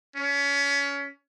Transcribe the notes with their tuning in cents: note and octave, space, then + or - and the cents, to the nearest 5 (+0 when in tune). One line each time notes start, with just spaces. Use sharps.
C#4 +25